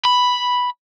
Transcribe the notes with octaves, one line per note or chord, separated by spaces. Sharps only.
B5